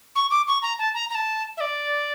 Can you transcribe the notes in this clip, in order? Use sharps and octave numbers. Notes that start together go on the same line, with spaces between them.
C#6
D6
C#6
A#5
A5
A#5
A#5
A5
E5
D5